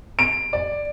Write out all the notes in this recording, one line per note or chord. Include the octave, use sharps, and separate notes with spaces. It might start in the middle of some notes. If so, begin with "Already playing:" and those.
D7
D5